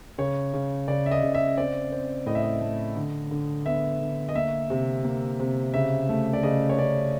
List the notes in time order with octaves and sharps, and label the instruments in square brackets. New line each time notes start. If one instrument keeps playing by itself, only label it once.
[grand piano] C#3 C#5
C#3
C#3 D5
E5
D#5
C#3
E5
C4 D5
C4
A2 D#5
E5
D#5
A3
D3
D3
B3 E5
D3
D#5
A#3 E5
C3
A#3
C3
C#3 E5
A3
D5
C#3 D#5
C#5
C#3 D5